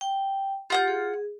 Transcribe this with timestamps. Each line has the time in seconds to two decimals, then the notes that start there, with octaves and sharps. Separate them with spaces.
0.01 G5
0.70 F4 G4 F#5 G6
0.88 G#4